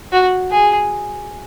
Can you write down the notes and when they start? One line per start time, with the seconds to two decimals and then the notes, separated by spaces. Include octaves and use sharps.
0.12 F#4
0.51 G#4